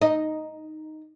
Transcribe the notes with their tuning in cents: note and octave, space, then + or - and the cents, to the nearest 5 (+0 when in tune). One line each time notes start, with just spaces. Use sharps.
D#4 +0 D#5 +0